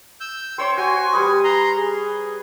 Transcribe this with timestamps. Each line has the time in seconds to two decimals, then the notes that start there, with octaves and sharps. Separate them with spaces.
0.20 E6 G6
0.58 C5 C#5 G5 C6 E6
0.77 F#4 G#5
1.13 G3 B4 D#6
1.44 A#5 C6
1.76 G#4